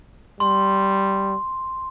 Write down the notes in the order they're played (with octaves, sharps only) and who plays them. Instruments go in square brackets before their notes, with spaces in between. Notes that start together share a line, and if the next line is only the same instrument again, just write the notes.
[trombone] G3 [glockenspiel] C6